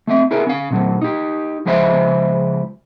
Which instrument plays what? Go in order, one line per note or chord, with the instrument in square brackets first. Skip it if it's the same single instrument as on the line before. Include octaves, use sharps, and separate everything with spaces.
[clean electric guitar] A3 C4 E5
E4 G#4 A#4 B4
C#4 F5
A#2 F#3 A3
D#4 G4
C#2 F3 G#3 B4 C5 E5